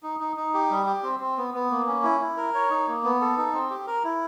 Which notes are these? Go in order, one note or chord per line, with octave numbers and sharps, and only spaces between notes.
D#4
D#4
D#4
G4
G3
G4
C4
C4
B3
B3
A#3
C#4
E4
E4
A#4
C#5
D#4
A#3
B3
A4
D#4
C4
G4
A#4
E4